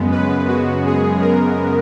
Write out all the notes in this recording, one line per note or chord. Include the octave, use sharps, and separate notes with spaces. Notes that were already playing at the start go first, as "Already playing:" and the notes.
Already playing: F#2 C#3 G#3 B3
B4
F#4
G#4
A#4